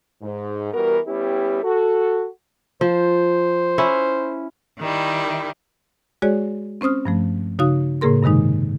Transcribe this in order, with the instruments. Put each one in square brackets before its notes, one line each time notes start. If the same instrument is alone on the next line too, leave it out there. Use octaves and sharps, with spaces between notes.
[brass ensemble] G#2
E3 G3 B3 F#4 A#4
G3 B3 C#4 E4 G4
F#4 A4
[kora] F3 [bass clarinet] C5
[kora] C#4 E4
[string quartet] D#3 G3 E4
[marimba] G#3 F#4 G#4 C#5 D5
C4 C#4 C5 D#6 F6
G2 F3 A3
C#3 D#4 F#4 F5 D#6
A2 C#3 A#3 G#4 A#4 C6
G2 C3 D#3 G#3 D#4